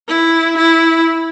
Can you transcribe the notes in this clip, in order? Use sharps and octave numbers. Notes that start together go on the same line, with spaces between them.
E4
E4